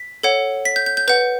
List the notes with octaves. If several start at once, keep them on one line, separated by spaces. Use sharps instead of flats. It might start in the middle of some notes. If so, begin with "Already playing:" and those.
Already playing: B6
A4 C#5 F#5
B6
G6
G6
G6
B4 F#5 G6